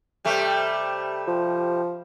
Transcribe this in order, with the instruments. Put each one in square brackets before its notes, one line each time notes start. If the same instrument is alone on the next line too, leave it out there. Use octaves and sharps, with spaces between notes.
[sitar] C3 G3 A3
[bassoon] F3